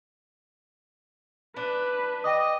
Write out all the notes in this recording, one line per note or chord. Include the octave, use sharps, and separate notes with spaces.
D4 B4
D#5 G5 D6 D#6